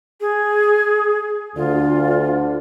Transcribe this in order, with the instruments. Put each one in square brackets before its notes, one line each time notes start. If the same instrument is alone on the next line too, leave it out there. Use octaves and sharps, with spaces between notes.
[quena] G#4
[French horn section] D2 D3 [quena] F4